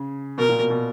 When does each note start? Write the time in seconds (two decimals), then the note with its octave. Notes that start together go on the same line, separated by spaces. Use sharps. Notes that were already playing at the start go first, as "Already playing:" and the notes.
Already playing: C#3
0.38 B2 A#4
0.49 A#2
0.59 B2
0.70 B2